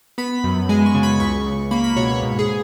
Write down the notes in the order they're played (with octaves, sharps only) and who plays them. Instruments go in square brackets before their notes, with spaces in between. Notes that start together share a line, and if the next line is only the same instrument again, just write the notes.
[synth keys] B3 B5
F#2
G#3 G#5
C#6
C#3
B5
C#2 C#6
C#2
A#3 B5
B5
B2 C#5
C#5
G#2
G#4